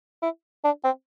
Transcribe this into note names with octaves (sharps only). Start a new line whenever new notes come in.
E4
D4
C4